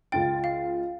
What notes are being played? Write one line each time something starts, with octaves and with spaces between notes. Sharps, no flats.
C#2 F4 G5 A6
F5